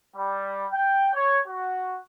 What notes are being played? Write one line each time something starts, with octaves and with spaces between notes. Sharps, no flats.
G3
G5
C#5
F#4